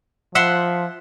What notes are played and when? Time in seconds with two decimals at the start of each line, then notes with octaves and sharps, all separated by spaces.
0.35 F3 E5 F#5 C6